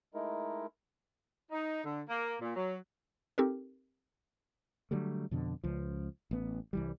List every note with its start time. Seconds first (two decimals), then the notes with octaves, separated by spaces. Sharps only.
0.14 G#3 A3 D#4 E4 A#4
1.51 D#4
1.83 D3
2.08 A#3
2.41 A#2
2.55 F#3
3.38 C4 D#4 G4 A4 A#4
4.91 D3 F#3 G3 A3
5.31 F2 B2 D3
5.64 C#2 F3
6.31 A1 B3
6.73 C2 E3 G3